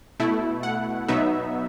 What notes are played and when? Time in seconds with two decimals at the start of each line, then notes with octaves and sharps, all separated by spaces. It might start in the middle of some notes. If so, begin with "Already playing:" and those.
0.20 B2 A3 E4
0.63 F#5
1.08 B2 F#3 B3 D#4 E5